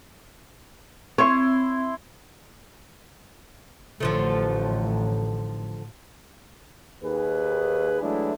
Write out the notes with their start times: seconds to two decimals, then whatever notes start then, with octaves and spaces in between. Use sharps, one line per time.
1.18 C4 E4 C#5 C6
4.00 A1 D3 F3 A3
7.04 D#2 G#4 B4
8.02 E3 F#3 G#3 A3 D4 E4